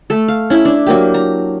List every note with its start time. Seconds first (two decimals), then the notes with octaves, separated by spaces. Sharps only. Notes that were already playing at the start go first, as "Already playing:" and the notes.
0.10 A3 A4
0.28 F5
0.50 C#4 E4 B5
0.65 D4
0.86 F#3 A#3 G4
1.14 A#5